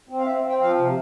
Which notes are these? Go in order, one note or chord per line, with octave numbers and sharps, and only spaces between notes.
C4
F5
C4 E5
C4
G5
F3 F5
C3